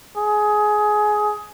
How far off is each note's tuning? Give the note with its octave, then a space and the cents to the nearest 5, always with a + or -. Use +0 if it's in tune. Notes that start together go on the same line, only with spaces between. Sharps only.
G#4 +20